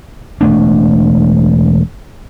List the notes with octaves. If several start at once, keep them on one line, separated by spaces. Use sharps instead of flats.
E1 A3 D4